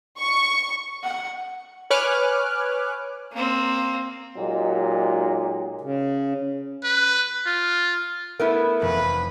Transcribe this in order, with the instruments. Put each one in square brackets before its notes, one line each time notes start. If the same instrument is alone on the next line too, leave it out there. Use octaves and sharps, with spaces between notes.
[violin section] C#6
[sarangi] F#5
[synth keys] B4 C#5 G#5 D6 F6 F#6
[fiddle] A#3 C4
[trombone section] A#2 F#3 G#3 D#4 G4
[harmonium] C#3
[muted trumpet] B4
F4
[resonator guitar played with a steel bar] A3 B3 E4 [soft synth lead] A#4
[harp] F1 [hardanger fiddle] B4